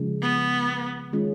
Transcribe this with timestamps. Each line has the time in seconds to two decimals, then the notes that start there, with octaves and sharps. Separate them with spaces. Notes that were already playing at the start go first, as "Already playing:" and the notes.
Already playing: C#3 F3 G#3
0.22 B3
1.13 D#3 G#3 C#4 F4